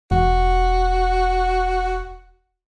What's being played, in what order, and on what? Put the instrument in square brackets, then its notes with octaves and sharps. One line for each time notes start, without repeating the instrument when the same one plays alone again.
[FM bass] E1 [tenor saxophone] F#4